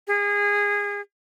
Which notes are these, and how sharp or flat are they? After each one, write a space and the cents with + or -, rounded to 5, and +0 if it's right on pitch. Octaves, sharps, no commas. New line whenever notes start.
G#4 -25